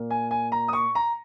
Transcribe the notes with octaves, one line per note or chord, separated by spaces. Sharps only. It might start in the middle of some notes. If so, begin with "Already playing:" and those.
Already playing: A#2 A#3
G#5
G#5
A#5
D#6
C#6
A#5